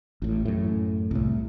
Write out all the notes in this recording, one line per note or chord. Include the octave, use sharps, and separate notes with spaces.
A1 A2
F#2 A2
C2 A2